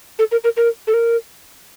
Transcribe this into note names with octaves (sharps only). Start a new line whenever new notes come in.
A4
A#4
A#4
A#4
A4
A#4